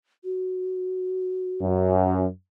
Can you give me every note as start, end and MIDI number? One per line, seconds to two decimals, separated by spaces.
0.24 2.18 66
1.62 2.26 42